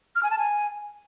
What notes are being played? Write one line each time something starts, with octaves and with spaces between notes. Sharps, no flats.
F6
G#5
A5
G#5